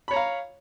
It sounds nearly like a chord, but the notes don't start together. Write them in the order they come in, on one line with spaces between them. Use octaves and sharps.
B5 C#5 A#5 F5